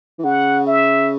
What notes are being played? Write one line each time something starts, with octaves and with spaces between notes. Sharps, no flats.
E3
C#3 F#5
E5